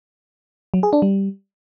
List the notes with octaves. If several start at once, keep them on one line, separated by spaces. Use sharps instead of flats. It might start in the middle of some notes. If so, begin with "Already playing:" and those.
F#3
G#4
D4
G3